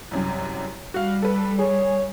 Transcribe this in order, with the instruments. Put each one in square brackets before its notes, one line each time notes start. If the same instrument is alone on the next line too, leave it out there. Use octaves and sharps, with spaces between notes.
[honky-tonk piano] C2 F#2 C3
[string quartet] G3 [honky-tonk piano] F#4 F5
[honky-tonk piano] A4 B4
[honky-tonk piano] G#4 [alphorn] C#5